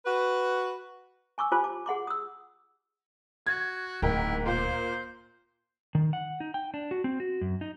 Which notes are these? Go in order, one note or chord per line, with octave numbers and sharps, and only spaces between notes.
F#4 B4
G#5 C#6 D6 E6
F4 G4 C5 G#5 A5 D6
A5 D6
G#4 F#5 C6 D6
D#6 E6
F#4 G#6
D1 G#2 E4 A#4 G5
A#2 A#3 C5
D#3
F#5
D#4
G5
D4
F#4
C4
F#4
F#2
D#4